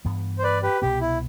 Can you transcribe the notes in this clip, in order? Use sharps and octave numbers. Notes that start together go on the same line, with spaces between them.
G2 E3 B3
C5
B4 D5
G4 B4
C2 B2 B3 G4
E4